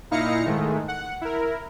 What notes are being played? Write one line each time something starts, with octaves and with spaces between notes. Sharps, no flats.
A#2 D#4 E4 F5 A#6 C#7
G#2 D#3 G#3 A3
F#5
E4 A#4